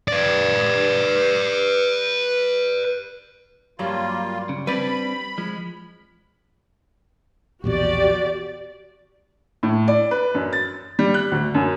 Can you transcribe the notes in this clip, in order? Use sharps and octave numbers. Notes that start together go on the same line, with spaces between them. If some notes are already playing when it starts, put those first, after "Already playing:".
B4 D5
G2 F#3 G3 A#3 F4
C#3
G3 C4 D4 B4 D5 B5
F3 G#3
A#1 E2 B2 F#4 G4 D5
A2
D5
B4
F#2
A6
G3
F#6
D2
F#2